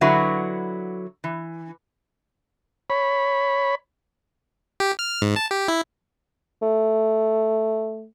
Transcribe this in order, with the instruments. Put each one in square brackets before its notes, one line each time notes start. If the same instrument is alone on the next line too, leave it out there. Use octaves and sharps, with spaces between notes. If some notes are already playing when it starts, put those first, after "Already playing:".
[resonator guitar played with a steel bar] D3 F#3 E4 F#4 B4
E3
[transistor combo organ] C#5 B5
[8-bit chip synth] G4
F6
G#2
A5
G4
E4
[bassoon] A3